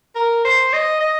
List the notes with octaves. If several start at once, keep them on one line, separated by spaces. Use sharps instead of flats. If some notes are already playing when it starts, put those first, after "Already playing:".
A#4
C5
D#5
D#5